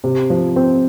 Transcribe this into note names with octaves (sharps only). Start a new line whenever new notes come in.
C3
F3
C4